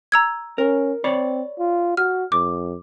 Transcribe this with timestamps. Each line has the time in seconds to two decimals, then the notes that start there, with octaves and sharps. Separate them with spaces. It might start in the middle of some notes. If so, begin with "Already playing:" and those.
0.12 A#5 E6 G#6
0.58 C#4 A#4
1.04 C4 C#5 D5 B5
1.59 F4
1.97 F#4 F6
2.32 F2 D6